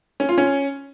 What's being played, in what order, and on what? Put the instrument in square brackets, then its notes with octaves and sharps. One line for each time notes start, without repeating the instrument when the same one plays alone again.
[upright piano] C#4
F4
C#4